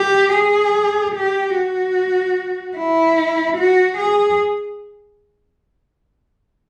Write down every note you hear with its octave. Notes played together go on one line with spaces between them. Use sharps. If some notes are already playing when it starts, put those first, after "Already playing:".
Already playing: G4
G#4
G4
F#4
E4
F#4
G#4